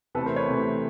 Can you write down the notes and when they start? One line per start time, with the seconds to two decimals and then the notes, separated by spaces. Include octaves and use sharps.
0.15 C3 E3 A3 A4 B4
0.26 A#4 C5
0.36 B4 C#5
0.48 C3 E3 A3